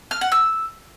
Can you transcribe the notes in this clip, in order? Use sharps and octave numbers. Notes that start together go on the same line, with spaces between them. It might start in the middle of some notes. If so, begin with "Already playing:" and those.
F6
F#5
E6